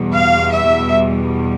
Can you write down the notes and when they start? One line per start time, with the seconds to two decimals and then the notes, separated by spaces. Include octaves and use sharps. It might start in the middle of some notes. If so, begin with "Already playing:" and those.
Already playing: E2 B2 G3
0.13 F5
0.52 E5